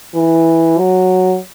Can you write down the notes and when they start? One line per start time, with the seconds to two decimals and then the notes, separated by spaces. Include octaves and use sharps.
0.14 E3
0.78 F#3